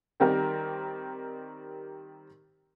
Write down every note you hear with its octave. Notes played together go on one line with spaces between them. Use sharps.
D#3 G3 C4 G4 A#4